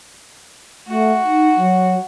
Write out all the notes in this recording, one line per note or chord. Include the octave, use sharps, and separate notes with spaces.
A3 F#4
D#4
F#3